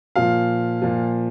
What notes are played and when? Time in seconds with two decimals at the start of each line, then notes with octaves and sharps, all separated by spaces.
0.16 A#2 F3 F5
0.82 A#2 F3